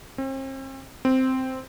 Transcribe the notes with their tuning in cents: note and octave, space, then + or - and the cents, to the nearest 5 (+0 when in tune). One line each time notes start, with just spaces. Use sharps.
C4 +40
C4 -5